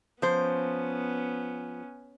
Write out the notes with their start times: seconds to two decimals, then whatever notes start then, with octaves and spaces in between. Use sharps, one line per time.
0.22 F3 B3 C#4 C5